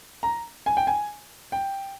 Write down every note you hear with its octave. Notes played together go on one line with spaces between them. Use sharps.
A#5
G#5
G5
G#5
G5